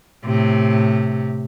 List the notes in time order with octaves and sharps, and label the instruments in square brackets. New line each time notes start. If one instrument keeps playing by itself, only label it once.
[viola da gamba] A2 C3